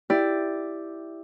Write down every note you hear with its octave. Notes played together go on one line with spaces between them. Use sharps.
E4 G4 D5